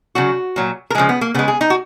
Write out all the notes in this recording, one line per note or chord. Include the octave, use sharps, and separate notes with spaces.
C#3 F#3 F#4
A#2 F#3
A#4
C#3 F3 G#3 G#4
B3
A#3
C#3 G#3 B3
G#4
D#4
F#4